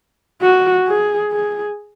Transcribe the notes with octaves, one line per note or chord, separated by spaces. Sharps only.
F#4
G#4
G#4